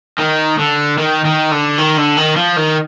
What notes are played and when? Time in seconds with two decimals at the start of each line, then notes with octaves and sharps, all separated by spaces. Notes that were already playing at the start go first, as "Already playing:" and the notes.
0.19 D#3
0.59 D3
0.98 D#3
1.25 D#3
1.51 D3
1.78 D#3
1.97 D3
2.17 D#3
2.36 F3
2.56 D#3